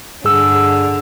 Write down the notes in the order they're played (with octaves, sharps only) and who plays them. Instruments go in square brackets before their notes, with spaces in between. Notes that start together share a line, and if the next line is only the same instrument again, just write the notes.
[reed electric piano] G2 G#4 E6 [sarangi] D3